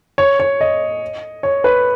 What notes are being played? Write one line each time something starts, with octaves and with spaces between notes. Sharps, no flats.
C#5
C#5
D#5
C#5
B4